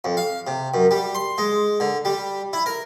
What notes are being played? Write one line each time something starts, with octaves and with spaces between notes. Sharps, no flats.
F2
F5
C3
F#2
G3
C6
G#3
D3
G3
E4
A#4